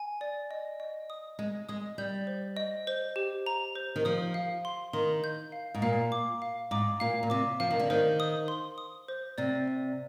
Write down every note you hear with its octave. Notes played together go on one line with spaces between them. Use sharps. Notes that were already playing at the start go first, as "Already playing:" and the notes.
Already playing: G#5
D5
D#5
D#5
D#6
G#3 D#5
G#3 D#6
G3 G6
C5
D#5
C5
G4
A#5
C5
D#3
F3 D#6
F5
C6
D#3 C6
G6
F5
G#2
A#2 F5
D6
F5
G#2 D6
A#2 F5
A#2
C3 D6
F3 F5
D#3
D3
D#3 C5
D#6
C6
D#6
C5
C3 D5
D5